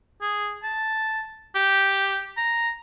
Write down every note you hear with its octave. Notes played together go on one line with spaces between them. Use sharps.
G#4
A5
G4
A#5